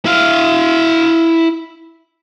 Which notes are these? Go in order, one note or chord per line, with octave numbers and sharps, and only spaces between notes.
E4 F5